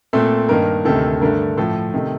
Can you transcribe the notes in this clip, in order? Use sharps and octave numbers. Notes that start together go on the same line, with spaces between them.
A#2 A3 C4 A4
G2 D#3 A#3 A#4
D2 C3 D#3 A4
G2 D3 A3 A#4
A2 F3 A3 A4
C3 D#3 A3